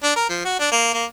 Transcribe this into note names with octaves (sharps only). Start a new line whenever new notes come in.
D4
A#4
F3
F#4
D4
A#3
A#3